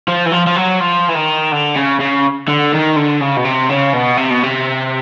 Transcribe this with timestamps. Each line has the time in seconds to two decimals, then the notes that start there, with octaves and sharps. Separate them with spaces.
0.08 F3
0.26 E3
0.32 F3
0.47 F3
0.56 F#3
0.80 F3
1.09 E3
1.16 D#3
1.53 D3
1.76 C#3
2.00 C#3
2.48 D3
2.72 D#3
2.96 D3
3.21 C#3
3.37 B2
3.44 C3
3.69 C#3
3.93 B2
4.17 C3
4.30 B2
4.43 C3